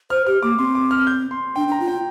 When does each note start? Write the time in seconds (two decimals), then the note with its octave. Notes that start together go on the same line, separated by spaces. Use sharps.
0.10 C5 F6
0.27 G4 F6
0.42 A#3 D6
0.58 C4 C6
0.75 D6
0.91 F6
1.07 G6
1.31 C6
1.56 D4 G5
1.68 D4 A#5
1.80 F4
1.88 G5